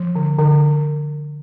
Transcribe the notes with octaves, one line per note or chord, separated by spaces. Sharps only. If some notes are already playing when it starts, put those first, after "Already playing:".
Already playing: F3
D3
D3